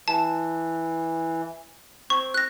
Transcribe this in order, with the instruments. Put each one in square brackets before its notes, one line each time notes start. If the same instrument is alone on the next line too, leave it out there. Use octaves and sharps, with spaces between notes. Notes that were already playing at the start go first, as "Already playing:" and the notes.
[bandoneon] E3 [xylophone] A5
[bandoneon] C4 [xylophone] C#6
[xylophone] F#6 A#6